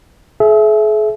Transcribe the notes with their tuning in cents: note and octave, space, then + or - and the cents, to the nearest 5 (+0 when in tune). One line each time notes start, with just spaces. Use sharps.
G#4 +45 E5 +5